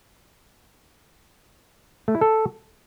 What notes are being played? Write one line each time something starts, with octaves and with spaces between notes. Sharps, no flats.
A3
E4
A4